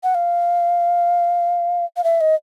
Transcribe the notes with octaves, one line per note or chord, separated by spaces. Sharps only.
F#5
F5
F5
E5
D#5